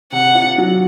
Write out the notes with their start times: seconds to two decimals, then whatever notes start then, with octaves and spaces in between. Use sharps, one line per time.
0.12 C3 F#5
0.35 F4
0.58 F#3